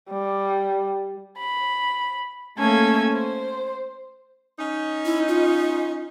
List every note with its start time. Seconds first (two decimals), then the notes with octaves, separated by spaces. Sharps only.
0.11 G3
1.39 B5
2.58 A3 A#3 C#4 A4 G#6
3.13 C5
4.59 C#4 D#4
5.05 E4
5.28 F4